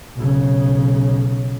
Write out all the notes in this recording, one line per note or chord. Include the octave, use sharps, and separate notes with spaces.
B1 C#3